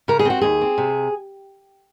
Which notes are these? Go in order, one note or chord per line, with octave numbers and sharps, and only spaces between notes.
C#3 A#4
G#4
C4 F#4
D#2 G#4
C4
C3